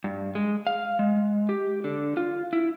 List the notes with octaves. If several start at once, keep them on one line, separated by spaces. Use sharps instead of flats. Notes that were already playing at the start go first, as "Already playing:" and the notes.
G2
G#3
F5
G#3
G4
D3
F4
E4